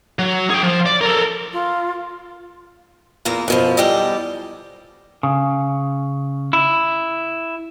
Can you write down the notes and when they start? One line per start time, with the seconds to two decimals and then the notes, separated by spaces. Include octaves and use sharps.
0.19 F#3
0.50 G#4 G5
0.63 F3
0.86 D5
1.01 A4 A#4
1.53 F4
3.25 E2 A#2 A#3 A#5
3.48 F#2 B2 F3
3.77 E2 G3 G4 A4 D#5
5.23 C#3
6.53 E4